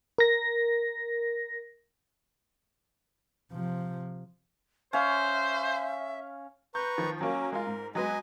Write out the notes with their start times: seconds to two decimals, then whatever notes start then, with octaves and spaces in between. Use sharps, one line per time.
0.18 A#4 A#6
3.51 C3 F3
4.93 C#4 C5 E5 F5
6.75 B4 A#5 C#6 G6
6.98 D#3 F3
7.21 F#3 A#3 C#4
7.52 G#3 F4 A#4
7.67 G#2
7.95 F#3 G#3 B3 D#5 G#5